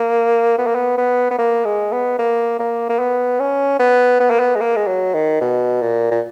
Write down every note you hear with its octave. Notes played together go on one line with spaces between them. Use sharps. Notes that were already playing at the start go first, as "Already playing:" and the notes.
Already playing: A#3
B3
A#3
B3
B3
B3
A#3
G#3
B3
A#3
A#3
A#3
B3
C#4
B3
B3
A#3
B3
G#3
A#3
G#3
F#3
D#3
B2
A#2
A#2